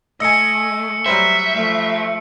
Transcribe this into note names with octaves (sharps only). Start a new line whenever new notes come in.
A3 D#5 G#5 E6 C#7
F#3 G3 C5 E5
F3 A3